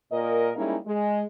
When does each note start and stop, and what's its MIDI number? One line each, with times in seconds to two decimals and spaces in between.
0.12 0.51 46
0.12 0.51 70
0.12 0.51 75
0.56 0.75 55
0.56 0.75 56
0.56 0.75 58
0.56 0.75 61
0.56 0.75 63
0.56 0.75 64
0.85 1.23 56